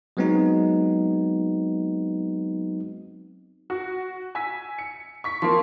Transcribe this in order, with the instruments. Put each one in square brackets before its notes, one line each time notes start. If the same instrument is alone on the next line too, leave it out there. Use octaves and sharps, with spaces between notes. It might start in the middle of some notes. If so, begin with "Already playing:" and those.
[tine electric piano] F#3 G#3 B3 C4 D#4 F#4
[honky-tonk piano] F#4
G#5 E6 B6
C#7
C#6 B6
[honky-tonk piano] F3 A#3 [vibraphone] C6